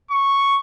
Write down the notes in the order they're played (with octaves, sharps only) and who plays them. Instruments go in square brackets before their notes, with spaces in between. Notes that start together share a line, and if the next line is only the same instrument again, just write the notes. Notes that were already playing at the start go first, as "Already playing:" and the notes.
[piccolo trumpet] C#6